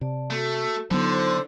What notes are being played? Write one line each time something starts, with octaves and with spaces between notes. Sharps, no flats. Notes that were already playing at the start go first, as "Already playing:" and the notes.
C3 D5 A5
A3 F#4 A4
D3 F#3 B3 D#4 F4 A4 C5